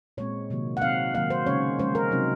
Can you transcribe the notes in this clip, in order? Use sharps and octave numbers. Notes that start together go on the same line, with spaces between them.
A#2 G#3 C4 C#5
C3 D#3 F#3 A#3
F#5
C3 F#3 C4 D#4 F5
D#3 F#3 A#3 F5
C5
C#3 G#3 C#4 C#5
F3 G#3 C#4 C5
A#4
C3 F#3 C4 D#4